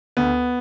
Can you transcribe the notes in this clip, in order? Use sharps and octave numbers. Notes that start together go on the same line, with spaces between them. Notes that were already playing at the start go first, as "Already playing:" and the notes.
D2 B3